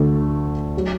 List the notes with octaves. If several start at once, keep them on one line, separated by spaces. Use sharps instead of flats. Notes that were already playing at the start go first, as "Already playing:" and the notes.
Already playing: D2 D3 A3
F#3